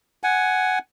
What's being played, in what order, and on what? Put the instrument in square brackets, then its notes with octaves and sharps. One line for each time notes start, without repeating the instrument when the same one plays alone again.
[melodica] F#5 G#5